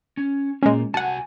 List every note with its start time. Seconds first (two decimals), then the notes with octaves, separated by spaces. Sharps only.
0.17 C#4
0.63 A#2 G#3 A#3 C#4
0.94 C2 F#4 F#5 G#5 A5